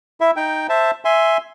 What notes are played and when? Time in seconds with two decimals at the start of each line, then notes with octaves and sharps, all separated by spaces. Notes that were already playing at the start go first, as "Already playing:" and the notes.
0.21 E4 E5
0.36 D#4 G5
0.69 C5 E5 A5
1.05 E5 G#5 C6